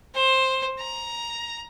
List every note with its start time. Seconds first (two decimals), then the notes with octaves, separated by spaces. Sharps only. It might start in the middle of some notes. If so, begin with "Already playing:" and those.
0.15 C5
0.79 A#5